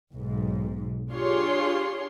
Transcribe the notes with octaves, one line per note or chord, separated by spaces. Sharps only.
B1 G#2
D4 F4 G4 G#4 C#5 C6